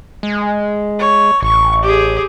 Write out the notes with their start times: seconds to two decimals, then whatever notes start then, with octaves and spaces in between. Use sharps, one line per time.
0.23 G#3
0.99 C#5
1.42 A1 C#6
1.83 G4 G#4